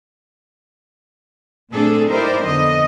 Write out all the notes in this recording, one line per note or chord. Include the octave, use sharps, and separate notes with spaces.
A#2 A3 C4 D4 G#4 A4
D#4 E4 G4 A#4 C5 D5
F2 D3 B3 D#5